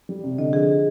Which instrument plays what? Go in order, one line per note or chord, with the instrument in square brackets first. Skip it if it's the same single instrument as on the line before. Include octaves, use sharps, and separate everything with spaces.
[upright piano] G3
C3
[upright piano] D3 [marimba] D#5
[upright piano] F3 [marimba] G#4